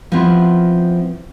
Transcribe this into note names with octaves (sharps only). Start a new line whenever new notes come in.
F3 B3 C4 E4 F4